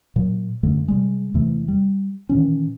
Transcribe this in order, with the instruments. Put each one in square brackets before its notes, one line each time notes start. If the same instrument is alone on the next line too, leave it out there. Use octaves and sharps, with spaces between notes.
[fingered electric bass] A#2 F#3
F#2 D3 G#3 A3
C3 G3 G#3
E2 C3 E3 A3
G3
A#2 D#3 E3 C#4